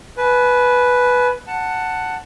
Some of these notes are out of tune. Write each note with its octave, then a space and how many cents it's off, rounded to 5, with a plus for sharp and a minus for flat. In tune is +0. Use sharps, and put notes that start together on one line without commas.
B4 +0 G#5 +40
F#5 +0 A5 +15